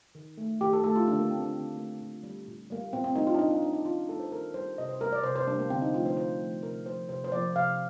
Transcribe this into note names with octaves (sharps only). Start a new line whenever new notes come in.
D#3
A3
D#3 G4
A4
A3 A4
F4
D3 D4
A#3
A3 C4
D4
D3 C4
A3 A#3
A#2
G3 A#3
A#2
G3 A#3
A#2 C4
C4
G3 A#3 D#4
F4
D4
A#2 D#4
D4
G3 A#3 D4
D#4
D#3 F4
G3 A#3 A4
C5
D#3 A#4
G3 A#3 C5
C3 D#5
C5
G3 A#3 A#4
D5
C3 C5
C5
G3 A#3 D4
A#3
D3 C4
D#4
F3 A3 F4
C5
D3 C5
F3 A3
C3 A#4
F3 A#3 C5
C3 C5
C5
F3 A#3 D5
C3 F5